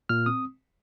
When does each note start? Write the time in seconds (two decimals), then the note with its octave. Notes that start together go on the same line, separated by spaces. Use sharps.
0.09 A#2 F6
0.26 C4 D#6